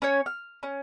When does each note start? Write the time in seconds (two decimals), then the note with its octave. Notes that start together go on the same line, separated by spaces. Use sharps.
0.02 C#4 C#5
0.26 F6
0.63 C#4